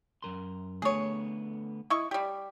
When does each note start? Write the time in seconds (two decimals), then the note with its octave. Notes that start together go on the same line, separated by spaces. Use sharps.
0.22 F#2 A#4 C6
0.82 D3 A3 B3 G#4 C#5
1.90 E4 D#5 C#6
2.11 G3 G4 D5